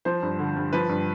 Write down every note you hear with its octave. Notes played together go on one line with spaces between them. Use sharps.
F3 C5
G2
D3
G2
F3 B4
G2